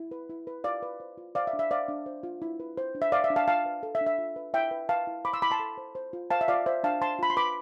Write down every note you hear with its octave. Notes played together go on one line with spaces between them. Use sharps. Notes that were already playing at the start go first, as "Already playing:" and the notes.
Already playing: E4
B4
E4
B4
F4 D5 F5
B4
C5
F4
C5 D5 F5
E5
D4
E5
C5 D5 F5
D4
C5
F4
E4
B4
C5
D4
E5
C5 D5 F5
E5
D4
F5 A5
F4 F5 A5
B4
A4
E5
D4
E5
F4
B4
E4 E5 G5
B4
B4 F5 A5
E4
C5 B5 D6
C6 E6
E4 B5 D6
A5 C6
A4
C5
C5
F4
C5 F5 A5
E5
F4 D5 F5
C5 E5
D4 F5 A5
C5 A5 C6
F4 B5
C6
B4 B5 D6